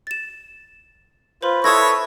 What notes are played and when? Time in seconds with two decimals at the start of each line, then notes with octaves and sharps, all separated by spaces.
0.07 A6 E7
1.42 F4 B4 C5 B5 C6
1.64 E4 A4 B4 C#5 E5 D#6 G#6 A#6